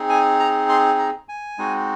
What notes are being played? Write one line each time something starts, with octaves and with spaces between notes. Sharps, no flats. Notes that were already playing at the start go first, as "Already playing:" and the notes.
Already playing: C4 D#4 G#4
G#5
A#5
C6
A#5
G#5
G#3 C4 D#4 F#4